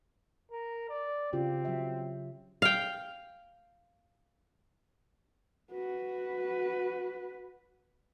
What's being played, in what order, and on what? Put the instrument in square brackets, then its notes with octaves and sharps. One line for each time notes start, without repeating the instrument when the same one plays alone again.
[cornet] A#4
D5
[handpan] C#3 F4 G4 [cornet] C4
[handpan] F#3 E5
[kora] F5 G5
[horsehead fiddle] F#4 B4